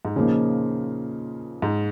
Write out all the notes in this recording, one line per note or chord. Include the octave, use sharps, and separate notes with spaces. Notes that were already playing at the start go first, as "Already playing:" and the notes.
G#2
A#2 C#3 F3 A#3 D#4
G#2